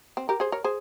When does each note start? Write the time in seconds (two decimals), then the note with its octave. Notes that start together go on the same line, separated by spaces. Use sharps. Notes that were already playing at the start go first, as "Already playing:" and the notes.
0.17 C4
0.29 G4 A#4
0.40 G#4 C5
0.52 A#4 C#5
0.64 G#4 C5